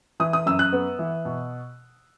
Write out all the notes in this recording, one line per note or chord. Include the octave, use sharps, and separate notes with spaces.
E3 D#6
D#6
F#2 E6
F#6
B3
E3
B2